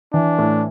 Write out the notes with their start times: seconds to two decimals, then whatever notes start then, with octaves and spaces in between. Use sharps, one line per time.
0.13 E3 D4
0.38 A2